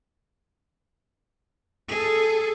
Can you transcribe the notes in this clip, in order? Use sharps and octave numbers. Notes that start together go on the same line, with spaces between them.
G#4 A4